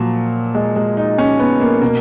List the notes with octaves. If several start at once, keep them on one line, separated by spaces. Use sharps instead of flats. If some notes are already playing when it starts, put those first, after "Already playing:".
Already playing: A#2 F3 F#3
G#3
G#3
D#4
C#4
B3
A#3
B2 A#3